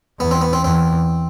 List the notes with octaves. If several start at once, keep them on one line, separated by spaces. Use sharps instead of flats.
E2 B3
C4
B3
C4
E2 C4